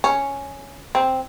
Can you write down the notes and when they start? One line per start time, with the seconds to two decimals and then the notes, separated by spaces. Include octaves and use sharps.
0.04 C#4
0.95 C4